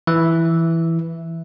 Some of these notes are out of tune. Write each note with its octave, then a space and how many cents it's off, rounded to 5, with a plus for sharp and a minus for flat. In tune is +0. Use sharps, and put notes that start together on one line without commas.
E3 +0 E5 +0